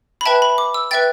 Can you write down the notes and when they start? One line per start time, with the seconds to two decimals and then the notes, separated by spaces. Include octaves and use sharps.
0.21 B5
0.26 B4 E5 G5 A5
0.42 B5
0.58 D6
0.74 E6
0.91 B4 E5 G5 A6